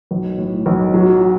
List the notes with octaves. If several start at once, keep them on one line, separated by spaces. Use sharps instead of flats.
B1
A2
B1
F#3